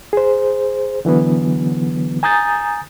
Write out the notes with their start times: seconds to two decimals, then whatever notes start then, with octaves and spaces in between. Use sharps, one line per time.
0.13 G#4 C5
1.05 D3 E3 F#3 B3
2.23 G#5 A#5 D#6 G6 A6